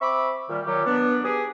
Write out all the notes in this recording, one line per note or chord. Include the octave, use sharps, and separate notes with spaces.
C4 E5 B5 C#6 D6
A#2 D#3 G3
A#2 D#3 F#3 G4 D6
B3 D4
B3 G4 G#4